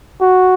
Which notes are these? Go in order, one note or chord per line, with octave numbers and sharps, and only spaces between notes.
F#4